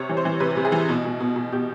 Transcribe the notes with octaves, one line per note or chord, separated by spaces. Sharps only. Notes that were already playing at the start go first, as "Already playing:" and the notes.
Already playing: C3 C#5
E3
C5
E3
C3 B4
C3
G#4
E3
B2
B2
B2
B2
B2 G4